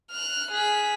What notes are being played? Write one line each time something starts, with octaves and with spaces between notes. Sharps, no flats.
F6 F#6
G#4 B6